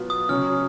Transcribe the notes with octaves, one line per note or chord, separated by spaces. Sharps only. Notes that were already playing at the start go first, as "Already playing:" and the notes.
Already playing: B2 F#3 B3 F4
D#6
C#3 F#3 C#4 F6